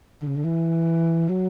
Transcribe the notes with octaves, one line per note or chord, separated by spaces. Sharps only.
D3
C#3
D3
E3
F#3